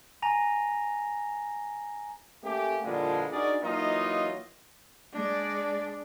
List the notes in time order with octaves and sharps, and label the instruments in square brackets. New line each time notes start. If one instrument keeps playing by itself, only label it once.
[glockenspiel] G#5 A#5 A#6 F7
[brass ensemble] A3 A#3 C#4 G4
A#2 D3 E3 F3 G3 G#3
D4 D#4 F#4 G#4 A#4 D5
E3 F#3 A#3 D#4 F4 D#5
[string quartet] G#3 D5 [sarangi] D4